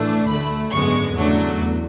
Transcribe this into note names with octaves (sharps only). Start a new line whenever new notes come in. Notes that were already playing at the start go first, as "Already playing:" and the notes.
Already playing: A2 E3 A3 D4
D2 D3 A3 B5
G#1 F#2 D3 G#3 B3 C#6
E2 C#3 F#3 A3 D4
E2